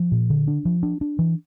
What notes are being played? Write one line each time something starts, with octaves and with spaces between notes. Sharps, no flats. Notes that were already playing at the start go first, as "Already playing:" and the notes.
Already playing: F3
A#2
D3
D4
F3
D4
D4
E3